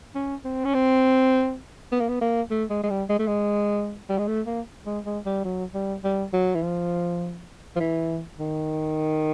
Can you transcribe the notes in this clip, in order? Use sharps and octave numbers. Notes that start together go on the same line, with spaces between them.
C#4
C4
C#4
C4
B3
A#3
B3
A#3
A3
G#3
G#3
G3
G#3
A3
G#3
G3
G#3
A3
A#3
G#3
G#3
G3
F#3
G3
G3
F#3
E3
F3
F3
E3
D#3